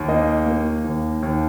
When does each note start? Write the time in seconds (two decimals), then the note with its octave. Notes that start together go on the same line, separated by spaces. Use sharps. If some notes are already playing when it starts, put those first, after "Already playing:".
Already playing: D#2
0.08 A#3 D#5
0.46 A#3
0.84 D#2
1.23 D#2